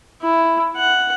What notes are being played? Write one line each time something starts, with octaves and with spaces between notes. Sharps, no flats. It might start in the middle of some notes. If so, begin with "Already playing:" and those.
E4
F#5